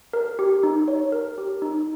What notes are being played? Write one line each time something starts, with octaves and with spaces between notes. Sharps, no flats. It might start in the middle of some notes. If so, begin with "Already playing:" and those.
A#4
G4
D#4
C#5
A#4
G4
D#4